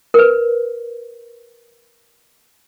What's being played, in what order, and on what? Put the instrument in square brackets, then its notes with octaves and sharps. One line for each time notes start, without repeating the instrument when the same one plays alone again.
[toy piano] A#4 B4